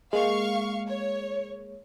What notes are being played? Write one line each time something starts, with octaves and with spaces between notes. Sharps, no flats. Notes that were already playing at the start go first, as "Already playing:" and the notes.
G#3 A#3 F5 C#6
C#5